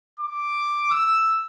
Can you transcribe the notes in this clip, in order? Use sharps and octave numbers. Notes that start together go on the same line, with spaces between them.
D6
E6